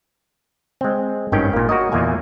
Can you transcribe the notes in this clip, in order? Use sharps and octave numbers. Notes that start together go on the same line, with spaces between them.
G#3 C4
G#1 G2 D#3 C#4 G5
A#2 A#3
F#4 A#4 C#5 D#5
E2 A#2 A#3 G#5